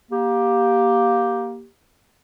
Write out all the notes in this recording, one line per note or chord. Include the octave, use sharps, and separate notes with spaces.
A#3 G4